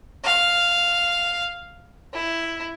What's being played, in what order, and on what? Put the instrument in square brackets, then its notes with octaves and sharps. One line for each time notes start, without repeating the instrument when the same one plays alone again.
[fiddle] F5
E4